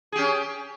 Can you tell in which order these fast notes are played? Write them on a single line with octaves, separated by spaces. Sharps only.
G#4 G4 C#4